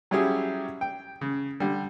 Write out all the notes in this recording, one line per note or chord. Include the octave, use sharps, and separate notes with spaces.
F#3 G3 C#4 E4 G4 G#4
G5
C#3
D3 G3